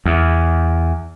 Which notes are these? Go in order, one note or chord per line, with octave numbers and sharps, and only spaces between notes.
E2